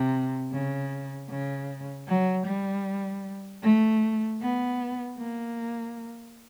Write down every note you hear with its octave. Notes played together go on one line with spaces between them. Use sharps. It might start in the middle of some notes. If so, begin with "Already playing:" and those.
Already playing: C3
C#3
C#3
F#3
G3
A3
B3
A#3